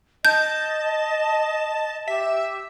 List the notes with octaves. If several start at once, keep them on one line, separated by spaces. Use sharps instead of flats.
D#5 A5 G6
G4 E5